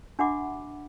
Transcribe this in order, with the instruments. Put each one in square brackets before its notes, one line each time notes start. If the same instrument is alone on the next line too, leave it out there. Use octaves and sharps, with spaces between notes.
[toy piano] D4 F#4 E5 F#5 B5 D6